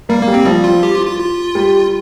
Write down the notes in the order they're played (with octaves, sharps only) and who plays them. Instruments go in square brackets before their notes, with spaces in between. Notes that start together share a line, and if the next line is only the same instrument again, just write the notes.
[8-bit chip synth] G3 [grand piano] A#3
[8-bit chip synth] A#3
[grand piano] G3
[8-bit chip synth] C4
[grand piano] F3 [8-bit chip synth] G3
[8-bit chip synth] F4
G4
F4
F4
F4
[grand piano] G3